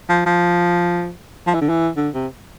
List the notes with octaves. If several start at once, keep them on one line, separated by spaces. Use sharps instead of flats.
F3
F3
F3
E3
D3
E3
D3
C3